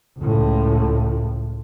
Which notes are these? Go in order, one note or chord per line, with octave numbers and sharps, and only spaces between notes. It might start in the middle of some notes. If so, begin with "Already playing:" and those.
C#2 A2